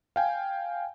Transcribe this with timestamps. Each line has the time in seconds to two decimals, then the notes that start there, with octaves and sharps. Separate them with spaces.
0.16 F5 G5 G#5